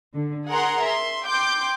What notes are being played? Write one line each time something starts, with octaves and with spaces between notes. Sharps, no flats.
D3
G#4 A#4 F#5 A#5 C6
E5 C6
G5 C6 D6 G6